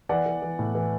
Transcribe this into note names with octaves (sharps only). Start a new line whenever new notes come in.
E3 D5 F#5
E3
E3
A2
E3